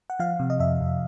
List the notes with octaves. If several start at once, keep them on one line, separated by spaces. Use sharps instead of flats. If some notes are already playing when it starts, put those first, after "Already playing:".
F#5
F3 F5
C3
D#5
F2 E5
F2